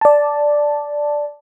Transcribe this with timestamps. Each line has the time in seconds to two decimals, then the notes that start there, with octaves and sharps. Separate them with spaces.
0.01 D5 A5